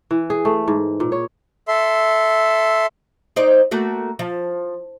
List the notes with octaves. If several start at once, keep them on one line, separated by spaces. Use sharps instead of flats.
E3
G#4
A3
G#2
A#2
C#5
A4 E5 C6
D#4 C5 D5
A3 A#3 F#4
F3